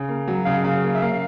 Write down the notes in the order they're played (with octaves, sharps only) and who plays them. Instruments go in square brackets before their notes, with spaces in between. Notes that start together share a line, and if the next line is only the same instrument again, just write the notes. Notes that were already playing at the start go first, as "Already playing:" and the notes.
Already playing: [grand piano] C#3
A#3
F#3
[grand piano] C#3 [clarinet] F5
[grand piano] C#3
A#3
[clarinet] E5
[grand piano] A#3 [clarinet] F5